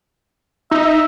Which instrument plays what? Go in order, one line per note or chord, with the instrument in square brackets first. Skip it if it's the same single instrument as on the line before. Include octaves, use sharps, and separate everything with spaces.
[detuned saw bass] D#4 [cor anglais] E5
[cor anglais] E5